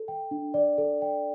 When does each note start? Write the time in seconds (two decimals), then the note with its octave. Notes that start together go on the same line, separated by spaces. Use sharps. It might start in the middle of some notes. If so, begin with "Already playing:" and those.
Already playing: A4
0.08 G5
0.31 D4
0.54 D5
0.78 A4
1.02 G5